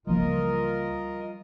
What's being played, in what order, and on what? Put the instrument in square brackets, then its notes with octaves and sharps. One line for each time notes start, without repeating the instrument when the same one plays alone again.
[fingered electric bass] C#2 E3 A#3 [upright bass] F3 G3 [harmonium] F4 A#4 D#5